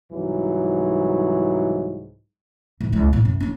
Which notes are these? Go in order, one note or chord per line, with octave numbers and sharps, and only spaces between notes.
C2 G#2 E3 F#3
G#2 D#3
C#2 E4
A2
F#2
C#4 D4